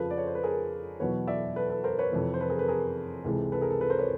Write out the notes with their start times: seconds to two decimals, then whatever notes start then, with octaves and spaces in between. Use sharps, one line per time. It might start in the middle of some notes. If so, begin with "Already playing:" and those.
Already playing: F2 C#3 F3 A4 B4
0.10 D5
0.18 C#5
0.27 C5
0.35 B4
0.43 G#4 A#4
1.00 E2 B2 F#3 B4 C#5
1.27 D5 E5
1.56 A4 B4
1.70 A4 B4
1.84 A#4 C5
1.99 B4 C#5
2.12 F2 C3 E3
2.34 C5
2.40 A4 B4
2.50 G#4 A#4
2.59 A4 B4
2.68 G#4 A#4
3.24 C#2 C3 E3 G#3 A4
3.52 A4 B4
3.61 G#4 A#4
3.71 A4
3.81 A4 B4
3.90 A#4 C5
3.99 B4 C#5